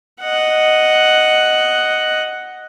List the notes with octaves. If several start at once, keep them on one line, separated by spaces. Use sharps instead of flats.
D#5 F#5